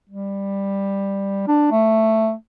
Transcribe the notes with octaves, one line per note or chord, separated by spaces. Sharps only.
G3
D4
A3